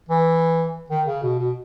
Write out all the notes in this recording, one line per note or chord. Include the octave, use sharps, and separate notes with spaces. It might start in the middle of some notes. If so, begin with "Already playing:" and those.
E3
D#3
C#3
B2
B2